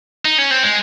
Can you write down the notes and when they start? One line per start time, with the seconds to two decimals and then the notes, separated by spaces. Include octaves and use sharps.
0.25 D#4
0.38 C#4
0.51 C4
0.63 G#3